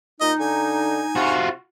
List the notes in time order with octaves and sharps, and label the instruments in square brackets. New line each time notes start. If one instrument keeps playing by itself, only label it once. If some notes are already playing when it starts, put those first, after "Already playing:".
[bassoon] A#2 [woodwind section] D#4 [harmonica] D#5
[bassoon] D3 [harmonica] G#5
[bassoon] C3 [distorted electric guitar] F4 F#4